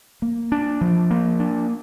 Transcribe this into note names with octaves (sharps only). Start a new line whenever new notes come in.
A#3
D4
F3
A#3
D4